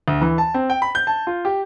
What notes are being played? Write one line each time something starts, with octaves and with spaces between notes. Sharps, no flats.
D2
E3
A5
C4
G5
B5
G6
A5
F4
G4